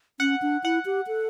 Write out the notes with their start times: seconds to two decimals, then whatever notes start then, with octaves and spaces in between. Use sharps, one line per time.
0.20 C#4 F#5
0.42 D4
0.64 E4 F#5
0.85 G4
1.07 A4